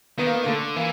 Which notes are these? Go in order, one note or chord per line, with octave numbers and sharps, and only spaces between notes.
D#3 B3
A#3
B3
A#3
D3 A3
E3 A#3